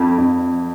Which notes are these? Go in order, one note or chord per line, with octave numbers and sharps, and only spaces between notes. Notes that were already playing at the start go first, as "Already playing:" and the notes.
Already playing: F2
F2